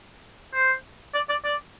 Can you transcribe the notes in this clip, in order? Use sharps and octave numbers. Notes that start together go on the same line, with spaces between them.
C5
D5
D5
D5